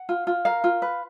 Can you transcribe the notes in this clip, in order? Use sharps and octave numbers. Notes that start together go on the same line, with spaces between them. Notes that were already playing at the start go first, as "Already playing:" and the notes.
Already playing: F#5
F4
F4
A#4 F5
F4
B4